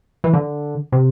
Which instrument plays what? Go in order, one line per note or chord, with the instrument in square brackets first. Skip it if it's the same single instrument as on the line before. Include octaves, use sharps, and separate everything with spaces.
[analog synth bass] E3
D3
C3